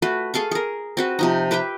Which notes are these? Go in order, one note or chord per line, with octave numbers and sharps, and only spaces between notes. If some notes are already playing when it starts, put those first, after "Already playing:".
A3 F#4 B4
G#4 A4 F5 C#6
G#4 A#4
C4 F#4 B4
C3 F3 D#4
G4 B4 E5 G5